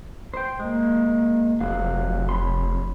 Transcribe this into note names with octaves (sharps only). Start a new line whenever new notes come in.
C5 G5
G#3 A#3
F1 F#3 F5
C#5 B5 C6